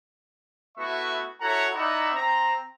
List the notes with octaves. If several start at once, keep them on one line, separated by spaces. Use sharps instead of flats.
A3 B3 E4 F#4 E5 C#6
E4 F#4 A4 C#5 F#5 A#5
D#4 E4 D5 E5 F#5 A#5
C4 A#5